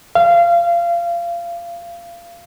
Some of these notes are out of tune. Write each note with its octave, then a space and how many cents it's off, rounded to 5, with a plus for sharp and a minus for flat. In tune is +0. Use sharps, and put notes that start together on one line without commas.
F5 -25